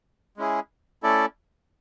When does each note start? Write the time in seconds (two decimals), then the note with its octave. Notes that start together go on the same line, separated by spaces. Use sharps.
0.37 G#3 C#4 E4 G#4
1.03 A3 C#4 E4 A4 D5